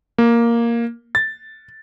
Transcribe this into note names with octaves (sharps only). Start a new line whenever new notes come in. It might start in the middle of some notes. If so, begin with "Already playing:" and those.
A#3
A6